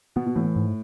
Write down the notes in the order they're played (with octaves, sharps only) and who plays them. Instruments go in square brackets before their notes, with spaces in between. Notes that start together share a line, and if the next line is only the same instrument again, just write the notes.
[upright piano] B2 [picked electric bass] B3
[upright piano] B2
[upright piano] A2 [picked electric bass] E3
[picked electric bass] G#2